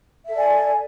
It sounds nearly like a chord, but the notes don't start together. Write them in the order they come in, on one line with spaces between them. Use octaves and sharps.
E5 A4 D5 G#5